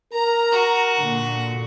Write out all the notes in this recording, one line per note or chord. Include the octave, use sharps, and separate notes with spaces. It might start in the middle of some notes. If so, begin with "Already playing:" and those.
A#4 A#5
F#4
A#2 D3